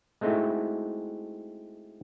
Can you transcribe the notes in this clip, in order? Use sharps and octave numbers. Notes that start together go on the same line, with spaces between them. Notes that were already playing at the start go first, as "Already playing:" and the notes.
G#3 A3 C4 D#4 E4 F#4